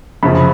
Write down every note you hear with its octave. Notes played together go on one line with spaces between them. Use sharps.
F#2 C#3 F3 B5